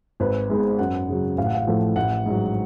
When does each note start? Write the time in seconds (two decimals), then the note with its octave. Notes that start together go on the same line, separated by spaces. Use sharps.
0.20 G#1 B4
0.50 G#2 G#3 B3
0.79 F#2 F#5
1.09 C#3 F#3
1.38 A1 F5
1.46 F#5
1.55 F5
1.67 A2 F3 A3
1.96 A1 F#5
2.26 G#2 F#3